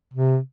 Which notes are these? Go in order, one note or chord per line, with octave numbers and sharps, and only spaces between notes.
C3